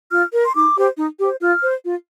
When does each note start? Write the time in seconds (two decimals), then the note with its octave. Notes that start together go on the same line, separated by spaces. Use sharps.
0.11 F4 F6
0.33 A#4
0.43 C6
0.54 D#4 D6
0.77 G4 C5
0.98 D#4
1.19 G4 C5
1.41 F4 F6
1.63 C5
1.84 F4